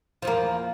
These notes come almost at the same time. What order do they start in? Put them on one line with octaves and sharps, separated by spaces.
F3 E2 A#3